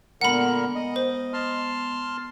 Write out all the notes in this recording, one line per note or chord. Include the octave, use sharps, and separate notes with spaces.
A#2 D3 G#3 B3 A#4 F#5 B5
D#5
C5
A5 C6 F6